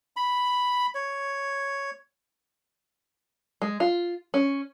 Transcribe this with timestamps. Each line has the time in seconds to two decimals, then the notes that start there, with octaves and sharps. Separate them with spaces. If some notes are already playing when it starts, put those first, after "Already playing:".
0.16 B5
0.95 C#5
3.62 G#3
3.80 F4
4.34 C#4